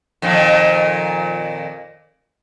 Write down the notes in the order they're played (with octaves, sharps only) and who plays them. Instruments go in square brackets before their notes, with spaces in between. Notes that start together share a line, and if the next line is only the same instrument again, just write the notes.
[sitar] F2 A#2 D#3